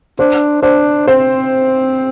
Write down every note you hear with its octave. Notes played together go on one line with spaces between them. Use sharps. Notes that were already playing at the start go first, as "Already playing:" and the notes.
D4 C5
D4 C5
C4 C5